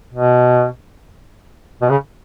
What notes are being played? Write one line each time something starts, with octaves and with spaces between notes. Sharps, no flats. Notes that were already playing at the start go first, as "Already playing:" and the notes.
B2
B2
C#3